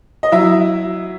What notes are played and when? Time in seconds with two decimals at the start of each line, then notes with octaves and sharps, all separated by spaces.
0.23 D#5
0.32 F#3 E4 E5